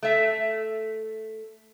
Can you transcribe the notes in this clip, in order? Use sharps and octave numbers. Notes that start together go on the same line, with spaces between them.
A3 E5